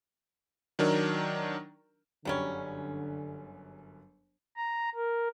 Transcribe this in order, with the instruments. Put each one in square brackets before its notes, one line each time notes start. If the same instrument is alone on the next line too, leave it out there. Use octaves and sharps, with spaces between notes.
[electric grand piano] D#3 F#3 D4 A#4
[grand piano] G1 F#2 [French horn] D3 [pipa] F#3 G3 C#4
[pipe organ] A#5
A#4